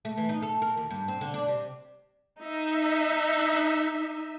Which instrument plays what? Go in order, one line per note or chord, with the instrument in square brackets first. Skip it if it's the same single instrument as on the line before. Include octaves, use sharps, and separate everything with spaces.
[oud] A3
E3
D#4
A4
A#4
D#2
G2
C4
D3
D4
C3
[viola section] D#4 E5